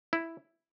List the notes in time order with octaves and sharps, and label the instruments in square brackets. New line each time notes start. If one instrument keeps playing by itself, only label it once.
[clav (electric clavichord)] E4